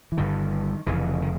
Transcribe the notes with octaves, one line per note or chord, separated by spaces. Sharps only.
E3
G1 G2 D3 D#3
F1 F2 C#3 E3
D#3